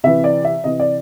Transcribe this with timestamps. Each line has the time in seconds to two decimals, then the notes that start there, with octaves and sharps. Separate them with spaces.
0.04 C3 E3 E5
0.24 D5
0.45 E5
0.64 C3 E3 D#5
0.80 D5